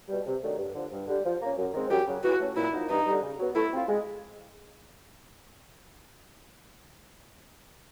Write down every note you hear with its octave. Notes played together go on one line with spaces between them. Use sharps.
B2 G3
C3
D#3 F#3 A3 D4
G2
D3 F3
G2
D3 G3
F3
A#3 C#4
F#2
D#3 G#3 C4
F#2 G4
C#3 F#3
E3 F#4
A3 C#4
A#2 E4
F3 A#3 D#4 F#4
G2 D#4
D3 G3
C#3
F#3 B3
A3 E4
C4 F4
G#3